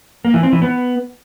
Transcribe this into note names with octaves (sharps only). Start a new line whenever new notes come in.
A#3
E3
C4
E3
B3